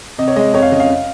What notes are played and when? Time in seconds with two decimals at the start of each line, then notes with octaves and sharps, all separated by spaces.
0.18 C3 D#5
0.28 C#5
0.36 G#3 D#5
0.53 F2 C#5
0.62 F5
0.72 C#3 D#5
0.80 F5